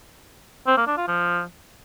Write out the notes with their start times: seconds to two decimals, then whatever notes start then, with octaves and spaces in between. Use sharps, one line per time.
0.67 C4
0.77 A#3
0.87 D4
0.97 F4
1.08 F3